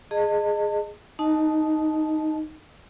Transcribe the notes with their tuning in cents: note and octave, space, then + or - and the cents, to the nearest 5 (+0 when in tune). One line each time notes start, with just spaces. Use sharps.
G#4 +0 D#5 -20 A5 +35
D#4 +0 D#5 +0 A5 -15